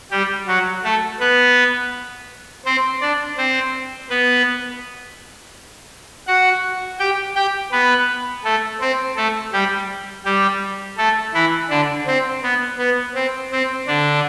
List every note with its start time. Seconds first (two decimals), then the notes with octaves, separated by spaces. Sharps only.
0.11 G3 G4
0.47 F#3 F#4
0.84 A3 A4
1.20 B3 B4
2.65 C4 C5
3.01 D4 D5
3.37 C4 C5
4.10 B3 B4
6.27 F#4 F#5
6.99 G4 G5
7.36 G4 G5
7.72 B3 B4
8.44 A3 A4
8.81 C4 C5
9.16 A3 A4
9.53 G3 G4
10.25 G3 G4
10.97 A3 A4
11.34 E3 E4
11.70 D3 D4
12.07 C4
12.43 B3
12.78 B3
13.15 C4
13.51 C4
13.87 D3 D4